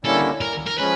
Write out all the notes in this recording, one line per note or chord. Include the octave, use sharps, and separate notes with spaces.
D3 G3 A#3 C#4 E4 A4
A#4
A#4
F3 G#3 C#4 B4